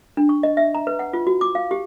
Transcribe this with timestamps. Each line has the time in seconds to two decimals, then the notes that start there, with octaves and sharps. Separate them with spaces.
0.17 D4
0.29 C#6
0.43 D#5
0.57 E5
0.75 A#5
0.87 B4
0.99 F#5
1.13 F4
1.27 F#4
1.41 D6
1.55 F5
1.71 G4